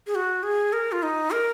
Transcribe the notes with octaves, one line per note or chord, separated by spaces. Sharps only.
G#4
F#4
G#4
A#4
F4
D#4
A#4